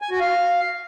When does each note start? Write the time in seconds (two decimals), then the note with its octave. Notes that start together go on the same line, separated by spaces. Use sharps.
0.02 G#5
0.11 F#4
0.20 F5